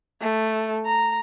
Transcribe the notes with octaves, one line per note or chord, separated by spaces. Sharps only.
A3
A#5